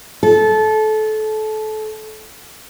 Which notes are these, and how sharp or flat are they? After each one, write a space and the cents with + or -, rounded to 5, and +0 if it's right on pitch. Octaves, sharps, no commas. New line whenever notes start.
A4 -25